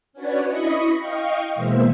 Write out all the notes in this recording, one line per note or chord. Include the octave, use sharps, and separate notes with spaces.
C#4 D4 F#4 B4 C#5 D5
E4 D#5 B5 C#6 D#6
D#5 F5 G5 C#6
B2 E3 G#3 A#3 C5 E5